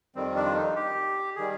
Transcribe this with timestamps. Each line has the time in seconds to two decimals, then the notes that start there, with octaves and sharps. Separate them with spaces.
0.15 F2 D#3 G3 C4
0.36 D4
0.45 F4
0.56 D#4
0.76 G4
1.36 D#3 G3 G#4